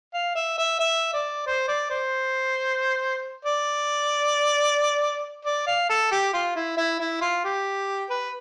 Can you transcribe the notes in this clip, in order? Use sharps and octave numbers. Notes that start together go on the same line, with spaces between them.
F5
E5
E5
E5
D5
C5
D5
C5
D5
D5
F5
A4
G4
F4
E4
E4
E4
F4
G4
B4